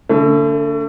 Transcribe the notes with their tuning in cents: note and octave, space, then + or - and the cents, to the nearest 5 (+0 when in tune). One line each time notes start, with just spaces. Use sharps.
D3 -30 A3 +30